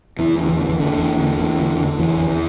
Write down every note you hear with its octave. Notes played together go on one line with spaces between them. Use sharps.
E2 E3
D3
E3
D3
E3
E2 D3
E2
D3
E2
D3
D3
E2 E3
E2
E3